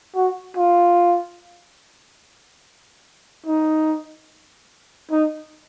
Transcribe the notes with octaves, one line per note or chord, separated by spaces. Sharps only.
F#4
F4
D#4
D#4